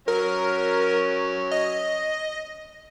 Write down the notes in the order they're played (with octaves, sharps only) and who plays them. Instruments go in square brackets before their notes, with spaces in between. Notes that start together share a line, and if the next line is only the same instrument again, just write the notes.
[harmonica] F#3 C#4 [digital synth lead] A#4
[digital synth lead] D#5